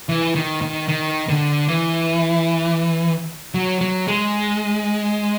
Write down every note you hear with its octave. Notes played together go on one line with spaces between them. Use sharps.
E3
D#3
D#3
D#3
D3
E3
F#3
F#3
G#3